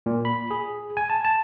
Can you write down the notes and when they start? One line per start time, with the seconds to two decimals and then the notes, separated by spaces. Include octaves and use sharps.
0.06 A#2
0.25 B5
0.51 G#4
0.97 G#5
1.10 A5
1.25 A5